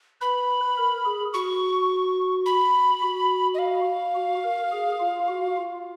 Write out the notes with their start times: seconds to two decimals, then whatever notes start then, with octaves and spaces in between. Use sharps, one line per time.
0.21 B4 B5
0.78 A#4
1.05 G#4
1.33 F#4 C#6
2.46 B5
3.02 F#4
3.54 D#5
3.59 F5
4.15 F#4
4.44 A#4
4.72 G#4
5.00 F4
5.28 F#4
5.57 F4